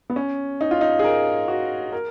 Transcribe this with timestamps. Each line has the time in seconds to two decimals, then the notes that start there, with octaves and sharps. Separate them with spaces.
0.10 B3
0.16 C#4
0.61 D#4
0.71 F4
0.81 D#4
0.99 G#4
1.04 A#4
1.48 F#4
1.92 A#4